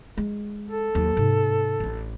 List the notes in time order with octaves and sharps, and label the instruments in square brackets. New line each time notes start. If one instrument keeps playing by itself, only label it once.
[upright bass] G#3
[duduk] A4
[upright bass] D#2 F#3
G#2 C3
A1 D4